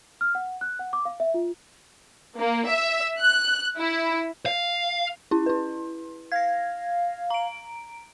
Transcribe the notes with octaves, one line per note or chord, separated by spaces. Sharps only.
F6
F#5
F#6
F#5
D6
F5
E5
F4
A#3
E5
F#6
E4
F5
C#4 E4
E4 B4
F5 G#6 A#6
A#5 D7